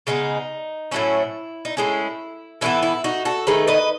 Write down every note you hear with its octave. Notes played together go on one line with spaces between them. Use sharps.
C#3 G#3 B3 D#4
A2 F#3 A3 C#4 E4
D#4
A2 G#3 C#4 E4
A2 E3 B3 E4
E4
D#4 F#4
F#4 A4
D#3 A3 D#4 G#4 B4
B4 D#5